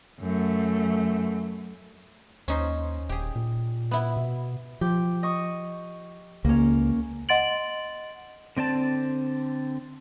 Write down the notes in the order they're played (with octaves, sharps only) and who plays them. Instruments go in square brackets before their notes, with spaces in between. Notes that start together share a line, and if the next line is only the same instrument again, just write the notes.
[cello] F#2 A3
[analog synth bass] D#2 [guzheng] C#4 D#4 C5
[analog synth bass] D#1 [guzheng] G4 G#4
[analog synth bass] A#2
[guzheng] B3 E4
[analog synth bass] B2
[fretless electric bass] F3 [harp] G4
[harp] D#5 C#6
[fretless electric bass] C#2 [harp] A#3 C#4
[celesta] D#5 F#5 C6 A6 D7 F#7
[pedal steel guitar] D3 C4 D5 A5